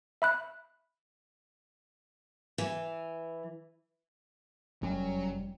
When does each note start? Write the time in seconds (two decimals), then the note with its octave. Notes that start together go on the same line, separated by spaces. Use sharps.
0.22 E5 B5 F#6
2.58 E3
4.83 F1 F#2 F#3 G3 C#4